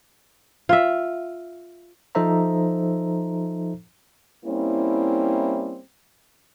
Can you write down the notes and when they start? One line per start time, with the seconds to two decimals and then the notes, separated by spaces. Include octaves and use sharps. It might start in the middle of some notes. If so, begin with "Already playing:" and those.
0.69 F4 E5
2.15 F3 D#4 A4 C5 E5 A#5
4.45 G3 A#3 C4 C#4 E4